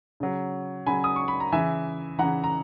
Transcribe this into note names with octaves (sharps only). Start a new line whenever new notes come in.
C#3 F#3
C#3 F#3 G#5 B5
D#6
C#6
B5
A#5
C#3 E3 E5 G#5
C#3 E3 F#5 A#5
A#5